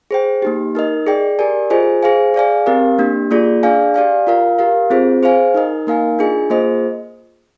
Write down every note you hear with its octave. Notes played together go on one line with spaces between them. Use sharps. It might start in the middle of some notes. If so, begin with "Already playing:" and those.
G#4 C5 G5
A#3 D#4 G4
D#4 A#4 D#5
G#4 D5 G5
G4 A#4 D5 G#5
F4 G#4 C5 D#5 G#5
G#4 C5 F5 G#5
G#4 D5 F5 G#5
C4 G4 A#4 F5
A#3 D4 G4
A#3 F4 G#4 D5
D4 G#4 D5 F5 G#5
G4 D5 F5 G#5
F4 A#4 F5
G4 A#4 F5
C4 F4 G#4 C5
G#4 C5 F5 G#5
D#4 A#4 D#5
A#3 D#4 A#4 F5 G#5
D4 F4 G#4 D#5 G#5
A#3 F4 G#4 C5 D#5